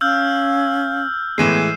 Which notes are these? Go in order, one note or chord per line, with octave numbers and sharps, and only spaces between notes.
C#4 F5 E6 F6 G6
A2 E3 G#3 B3 C7 D#7 E7